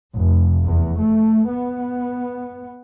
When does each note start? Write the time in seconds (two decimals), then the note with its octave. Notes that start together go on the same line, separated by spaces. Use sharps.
0.16 F1
0.66 E2
1.00 A3
1.50 B3